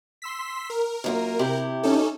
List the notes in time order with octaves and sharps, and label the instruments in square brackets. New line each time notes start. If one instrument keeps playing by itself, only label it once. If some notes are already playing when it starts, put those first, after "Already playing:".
[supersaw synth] C6 E6 B6
A#4
[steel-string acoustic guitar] F#2 A#3 F4
C3 E4 G4
[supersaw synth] C#4 D#4 A4